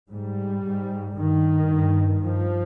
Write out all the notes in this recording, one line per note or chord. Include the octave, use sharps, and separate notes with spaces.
G#2 G3
G#2
G2 D#3
G2
G2 F3